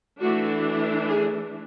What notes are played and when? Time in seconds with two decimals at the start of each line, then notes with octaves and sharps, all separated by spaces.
0.20 E3 A3 D4 F#4
1.07 G#4